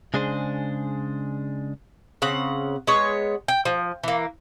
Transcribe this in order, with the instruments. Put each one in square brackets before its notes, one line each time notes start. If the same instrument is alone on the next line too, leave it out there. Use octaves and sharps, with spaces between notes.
[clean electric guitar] C#3 G#3 D4 G#4 C5
[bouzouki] C#3 C4 F#5
G#3 B3 C#5
G5
F3
E3 A#3